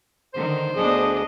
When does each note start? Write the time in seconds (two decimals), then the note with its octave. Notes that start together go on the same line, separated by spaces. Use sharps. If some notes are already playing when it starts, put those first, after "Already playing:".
0.34 D3 D#3 C5
0.76 D2 B3 D4 G#4 D#5